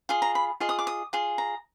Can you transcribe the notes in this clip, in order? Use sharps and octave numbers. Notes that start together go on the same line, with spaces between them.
F4 G#4
A#5
B5
F4 G#4 D#5
D#6
D6
D#6
F4 G#4
A#5